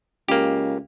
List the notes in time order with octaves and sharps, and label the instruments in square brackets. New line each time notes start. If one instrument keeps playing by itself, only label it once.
[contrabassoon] C#2 [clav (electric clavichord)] A#3 G4